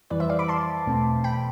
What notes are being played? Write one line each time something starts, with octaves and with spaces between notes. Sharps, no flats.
F2 E3 G3 B4 D5
C5 E5
D5 F5
B5 D6
A5 C6
E2 B2 A3 C4
G5 B5